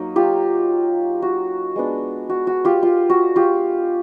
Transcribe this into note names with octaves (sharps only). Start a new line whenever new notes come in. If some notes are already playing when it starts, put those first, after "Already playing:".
Already playing: F#3 A#3 D#4
F4 G4
F#4
G#3 B3 D4
F#4
F#4
F4 G4
F4
F#4
F4 G4